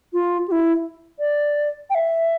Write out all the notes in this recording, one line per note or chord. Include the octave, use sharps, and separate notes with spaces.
F4
G4
E4
D5
G5
E5